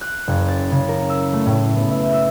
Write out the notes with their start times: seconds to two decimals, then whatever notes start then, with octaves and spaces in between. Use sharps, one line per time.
0.01 F#6
0.27 F#1
0.48 A6
0.71 C#3
0.89 A#4
1.09 E6
1.33 A3
1.46 A2
1.76 B3
1.90 E5
2.13 E6